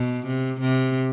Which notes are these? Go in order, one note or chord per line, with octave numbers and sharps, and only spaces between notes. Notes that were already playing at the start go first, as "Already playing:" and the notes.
Already playing: B2
C3
C3